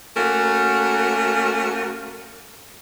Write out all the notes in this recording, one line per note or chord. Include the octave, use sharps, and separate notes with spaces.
A3 A#3 C#4 F#4 A#4